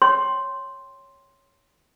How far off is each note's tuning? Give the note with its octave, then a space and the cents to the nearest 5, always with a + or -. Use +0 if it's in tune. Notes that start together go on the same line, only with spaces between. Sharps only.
C#5 +0 G5 +0 C6 +5